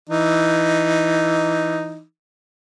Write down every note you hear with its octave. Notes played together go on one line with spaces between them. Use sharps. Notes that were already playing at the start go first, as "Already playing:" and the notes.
E3 D#4